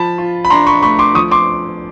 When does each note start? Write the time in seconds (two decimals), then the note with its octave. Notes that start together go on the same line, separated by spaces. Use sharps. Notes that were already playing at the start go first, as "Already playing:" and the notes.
Already playing: F3 A5 B5
0.18 F4
0.45 B5
0.50 D4 A#5 C6
0.67 B5 C#6
0.82 A3 B5 C#6
0.99 C6 D6
1.15 F3 C#6 D#6
1.31 C6 D6